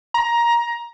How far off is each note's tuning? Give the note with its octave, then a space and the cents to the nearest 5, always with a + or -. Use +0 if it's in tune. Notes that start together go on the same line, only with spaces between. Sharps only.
A#5 +15